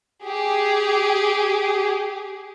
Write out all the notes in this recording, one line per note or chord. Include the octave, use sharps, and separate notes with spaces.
G4 G#4